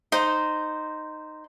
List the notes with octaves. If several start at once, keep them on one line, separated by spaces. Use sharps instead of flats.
D#4 C5